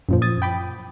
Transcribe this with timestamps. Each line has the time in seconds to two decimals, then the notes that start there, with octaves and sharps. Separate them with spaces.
0.09 F#2 A#2 F3
0.22 D#6 G#6 A6
0.42 G5 B5 D6